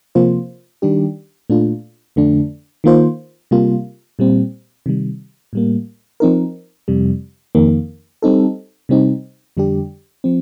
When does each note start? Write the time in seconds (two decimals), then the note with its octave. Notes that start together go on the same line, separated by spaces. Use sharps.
0.15 C3 F3 A#3 F4 C5
0.82 D#3 G3 D4 G4
1.50 A#2 A3 D4 F4
2.16 F2 D3 A3 D4
2.84 D#3 A#3 F4 C5
3.51 C3 G3 A#3 F4
4.19 A#2 G3 C4
4.86 C3 D#3 G3
5.53 A2 G3 A#3
6.20 F3 C4 D#4 A#4
6.88 F2 C3 G3
7.55 F2 D#3 A#3
8.22 G3 C4 D#4 A4
8.89 C3 G3 C4 D#4
9.57 F2 D3 G3 D4 G4
10.24 F3 C4